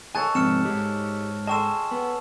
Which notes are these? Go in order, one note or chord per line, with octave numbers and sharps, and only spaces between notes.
G#4 A4 C#5 D#5 G#5 A5 F#6 A6
F2 G#2 C3 C4 B4 F6 C#7 E7
G#2 G#3 G4
G#4 A4 D#5 G5 A5 C6 C#6 E7
B3